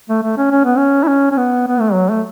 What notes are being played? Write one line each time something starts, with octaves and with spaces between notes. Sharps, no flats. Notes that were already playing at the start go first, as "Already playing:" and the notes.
A3
A3
C#4
C#4
B3
C#4
E4
C#4
C#4
B3
B3
A3
F#3
A3